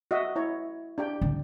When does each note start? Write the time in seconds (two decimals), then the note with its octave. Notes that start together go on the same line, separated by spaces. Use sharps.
0.11 F#4 D#5 E5
0.36 E4 C#5
0.98 D4 G4 G5
1.21 D3